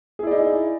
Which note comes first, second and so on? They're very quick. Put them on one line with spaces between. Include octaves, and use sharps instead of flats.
G#4 E4 D5 D#4